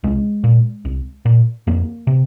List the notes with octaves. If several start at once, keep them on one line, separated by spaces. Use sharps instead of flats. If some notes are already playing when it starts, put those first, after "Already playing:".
C2 G#3
A#2
C2
A#2
F2 A#3
C3